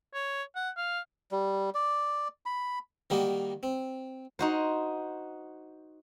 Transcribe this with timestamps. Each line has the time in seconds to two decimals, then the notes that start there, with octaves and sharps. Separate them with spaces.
0.14 C#5
0.56 F#5
0.77 F5
1.31 G3
1.75 D5
2.46 B5
3.10 D#3 G3 A#3 D#4 F#4
3.63 C4
4.39 D#4 F#4 C5